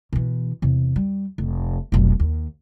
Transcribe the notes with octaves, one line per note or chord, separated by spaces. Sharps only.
B2 E3
E2 C3
G3
F1
F1 B1
D#2